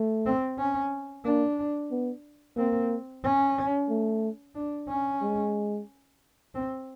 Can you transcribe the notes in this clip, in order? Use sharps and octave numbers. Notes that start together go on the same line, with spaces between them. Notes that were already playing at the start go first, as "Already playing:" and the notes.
Already playing: A3
C4
C#4
A#3 D4
B3
A#3 C4
C#4
A3
D4
C#4
G#3
C4